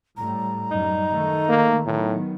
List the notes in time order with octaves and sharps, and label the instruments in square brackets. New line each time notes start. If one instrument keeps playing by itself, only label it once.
[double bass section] A2 G3 [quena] A#5
[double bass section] F#2 G3 [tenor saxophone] D#4
[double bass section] D#3 A3
[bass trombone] A#3
[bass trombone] A2 [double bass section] D#3 F#3 B3